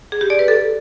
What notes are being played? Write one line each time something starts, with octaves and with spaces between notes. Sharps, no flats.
G#4
G4
D5
B4
A4